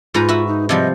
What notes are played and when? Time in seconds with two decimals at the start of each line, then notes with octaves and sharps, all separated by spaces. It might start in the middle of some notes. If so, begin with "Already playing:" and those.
0.14 G#2 F4 B4 A#5
0.29 F#4 B4 E5
0.48 D#4
0.69 C3 F3 G3 D#5